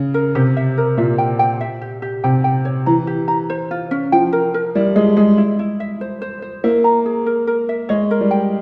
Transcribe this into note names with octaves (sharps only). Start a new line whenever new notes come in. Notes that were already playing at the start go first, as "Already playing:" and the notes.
Already playing: C#3
A#4
C3 G4
E5
A#4
A#2 E5
G5
G5
E5
G4
G4
C3 G5
G5
C#5
E3 A#5
G4
A#5
C5
F4
C#4
F3 G5
A#4
A#4
G3 E4
G#3 G#4
G#3 G#4
E4
E4
E5
C5
C5
C5
A#3 E5
A#5
G#4
A#4
A#4
E5
G#3 C#5
A#4
G3
G5